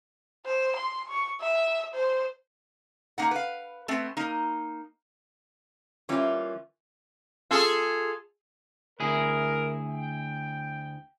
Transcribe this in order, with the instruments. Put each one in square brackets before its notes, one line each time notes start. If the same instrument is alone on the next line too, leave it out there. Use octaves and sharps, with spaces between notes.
[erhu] C5
C6
C#6
E5
C5
[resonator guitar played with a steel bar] A#3 D#4 F#5
B4 F5
A3 B3 C4
A#3 D#4
E3 G3 A#3 C#4 F4
[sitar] F4 G#4 A4
[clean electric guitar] D2 E4 G#4 [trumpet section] A#4
[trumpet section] G5